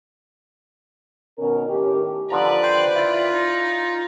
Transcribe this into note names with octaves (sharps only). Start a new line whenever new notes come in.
B2 D#3 C#4 A#4
A2 D#3 C#4 G4
D3 F3 B4 D5 A#5
C5 G5
E4 F4
D#4